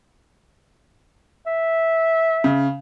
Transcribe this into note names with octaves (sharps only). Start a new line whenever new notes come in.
E5
C#3